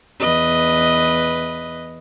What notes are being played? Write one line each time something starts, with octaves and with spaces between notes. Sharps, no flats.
E2 B4 D#5